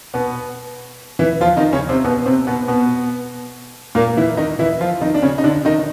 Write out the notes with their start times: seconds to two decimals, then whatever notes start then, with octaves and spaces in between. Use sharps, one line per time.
0.14 B2 B3
1.19 E3 E4
1.41 F3 F4
1.57 D#3 D#4
1.73 C#3 C#4
1.89 C3 C4
2.04 B2 B3
2.26 C3 C4
2.47 B2 B3
2.68 B2 B3
3.95 A#2 A#3
4.17 E3 E4
4.37 D#3 D#4
4.59 E3 E4
4.80 F3 F4
5.01 D#3 D#4
5.14 D4
5.22 C#3 C#4
5.38 D#4
5.44 D3 D4
5.65 D#3 D#4